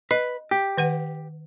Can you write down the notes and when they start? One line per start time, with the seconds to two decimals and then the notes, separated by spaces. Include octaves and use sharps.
0.11 B4 D#5
0.51 G4
0.77 D#3 B4 F#5